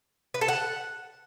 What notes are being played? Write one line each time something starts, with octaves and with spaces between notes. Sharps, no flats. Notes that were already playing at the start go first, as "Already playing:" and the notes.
B4
A4
F#5